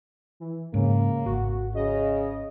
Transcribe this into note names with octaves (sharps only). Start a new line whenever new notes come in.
E3
G#2 C#3 A#3
G#1 F#4
C#3 D#5